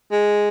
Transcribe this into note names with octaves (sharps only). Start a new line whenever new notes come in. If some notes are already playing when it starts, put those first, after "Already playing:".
G#3